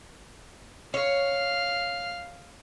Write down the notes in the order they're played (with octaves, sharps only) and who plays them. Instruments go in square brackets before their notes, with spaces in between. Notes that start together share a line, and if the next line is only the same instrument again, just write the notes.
[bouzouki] C#5 [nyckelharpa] F5